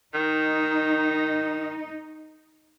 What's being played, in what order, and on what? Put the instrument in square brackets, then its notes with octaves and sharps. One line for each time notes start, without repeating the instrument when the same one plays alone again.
[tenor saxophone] D#3 [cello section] D#4